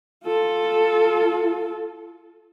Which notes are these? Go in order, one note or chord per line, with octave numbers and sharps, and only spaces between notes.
F4 A4